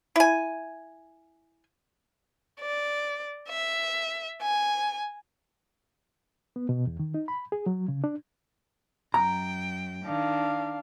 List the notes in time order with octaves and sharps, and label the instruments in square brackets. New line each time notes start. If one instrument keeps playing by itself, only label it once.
[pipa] E4 G#5
[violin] D5
E5
G#5
[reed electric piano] B3
B2
E2
D#3
D#4
B5
G#4
F#3
C#3
D4
[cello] F#2 G5 [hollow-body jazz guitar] A#5
[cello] D#3 [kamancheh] D4 F5